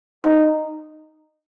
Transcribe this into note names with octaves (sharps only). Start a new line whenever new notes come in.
D#4